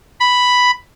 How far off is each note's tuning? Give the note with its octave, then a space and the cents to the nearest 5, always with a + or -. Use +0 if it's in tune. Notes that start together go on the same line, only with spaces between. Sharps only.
B5 +0